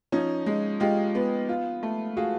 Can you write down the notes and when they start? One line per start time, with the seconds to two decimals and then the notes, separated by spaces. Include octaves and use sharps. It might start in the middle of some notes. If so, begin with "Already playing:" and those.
0.12 F3 C#4 D#4
0.46 G#3
0.80 G#3 F4 G4
1.15 B3
1.49 F4
1.83 A3
2.17 F4 F#4 G#4